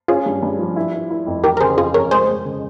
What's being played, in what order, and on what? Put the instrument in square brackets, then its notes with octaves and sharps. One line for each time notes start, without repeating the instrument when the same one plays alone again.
[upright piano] C#4 [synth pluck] F4 G#4
[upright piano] G2
G2
F3
E4
E4
E4
F2
[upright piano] E3 [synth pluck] G4 A#4
[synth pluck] A#4
[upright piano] C#3 [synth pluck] G#4 C5
[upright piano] F2 [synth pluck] F4 G#4
[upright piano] F2 [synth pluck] A#4 C#5
[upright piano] G#3 [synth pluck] G#4 C5
[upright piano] G#3
C#3